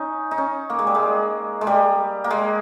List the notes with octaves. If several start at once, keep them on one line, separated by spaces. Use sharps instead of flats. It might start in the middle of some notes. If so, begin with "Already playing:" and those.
Already playing: C#4 D#4
D#4
C#4
A#3
G#3
G3
G#3
G#3
G3
A#3
G#3